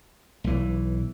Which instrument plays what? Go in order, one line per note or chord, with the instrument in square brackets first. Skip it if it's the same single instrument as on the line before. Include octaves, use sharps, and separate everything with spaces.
[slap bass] B1 E3